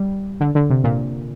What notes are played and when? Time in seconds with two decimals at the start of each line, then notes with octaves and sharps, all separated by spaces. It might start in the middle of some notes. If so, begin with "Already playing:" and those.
Already playing: G3
0.40 D3
0.55 D3
0.70 C3
0.84 A#2